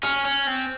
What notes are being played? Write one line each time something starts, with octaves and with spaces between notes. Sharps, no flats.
C#4 F6
C#4
C4